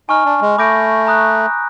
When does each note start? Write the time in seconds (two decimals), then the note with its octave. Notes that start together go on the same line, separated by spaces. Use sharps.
0.09 D#4 G#5 C#6 F6
0.25 D4
0.41 G#3
0.58 A3 B5 D6 G6 A#6 D7
1.07 A#5 D#6 F#6